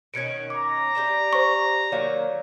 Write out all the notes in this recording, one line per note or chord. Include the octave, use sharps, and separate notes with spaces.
B2 D#3 C#4 G#6 C#7 D7
A#5 D6
G4 D5 E5
C5 C#6
D#3 F#3 A#3 C#5 D5 F5